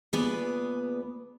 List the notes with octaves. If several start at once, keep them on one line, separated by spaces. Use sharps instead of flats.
D2 A#2 B3 G#4 B4 D5